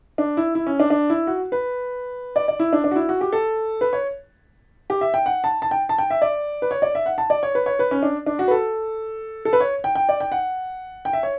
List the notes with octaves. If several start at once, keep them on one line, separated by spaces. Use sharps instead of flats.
D4
E4
E4
C#4
D4
D4
E4
F#4
B4
D5
D5
E4
D4
D4
F#4
E4
F#4
G4
A4
B4
C#5
G4
E5
G5
F#5
A5
A5
G5
A5
G5
E5
D5
B4
C#5
D5
E5
F#5
A5
D5
C#5
B4
C#5
B4
C#4
D4
D4
F#4
B4
A4
A4
B4
C#5
G5
G5
D5
G5
F#5
G5
E5
C#5